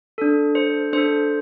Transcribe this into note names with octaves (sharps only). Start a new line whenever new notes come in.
D4 A4
C5
D4 A4 C5